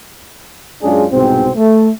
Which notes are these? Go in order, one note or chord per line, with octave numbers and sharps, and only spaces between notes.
F#2 G#3 C#4 D4 F4 G#4
C2 G#2 B2 C4
A3